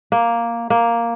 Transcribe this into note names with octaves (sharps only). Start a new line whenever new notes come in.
A#3
A#3